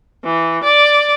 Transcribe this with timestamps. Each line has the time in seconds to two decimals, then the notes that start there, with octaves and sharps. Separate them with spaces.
0.24 E3
0.63 D5